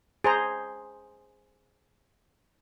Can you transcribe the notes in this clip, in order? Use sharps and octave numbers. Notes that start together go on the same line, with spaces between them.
G#4 C5 A#5